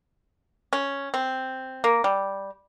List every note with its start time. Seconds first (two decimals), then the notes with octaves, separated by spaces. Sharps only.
0.73 C#4
1.14 C4
1.84 A#3
2.04 G3